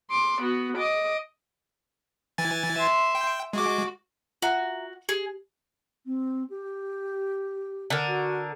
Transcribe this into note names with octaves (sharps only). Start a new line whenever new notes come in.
C6 D6
B3 F#4
D#5 D6
E3 G#5 A6
E5 C6
G5
G#3 F#4 D6
F4 F#4 E5 A#5
G4 G#4
C4
G4
D3 A#4
F#4